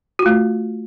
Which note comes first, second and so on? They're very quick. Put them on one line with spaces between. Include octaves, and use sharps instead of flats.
F#4 F4 A3